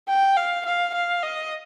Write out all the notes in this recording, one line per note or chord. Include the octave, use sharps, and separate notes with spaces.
G5
F5
F5
F5
D#5